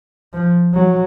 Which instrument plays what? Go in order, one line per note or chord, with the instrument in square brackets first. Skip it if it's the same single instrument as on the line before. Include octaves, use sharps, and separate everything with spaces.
[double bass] F3
F#3